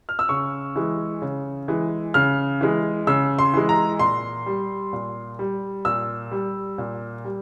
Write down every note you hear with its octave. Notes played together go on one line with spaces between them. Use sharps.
F6
E6
C#3 C#6
E3 G#3
C#3
E3 G#3
C#3 F6
E3 G#3
C#3 E6
C6
E3 G#3
A#5
A#2 C6
G3
A#2
G3
A#2 E6
G3
A#2
G3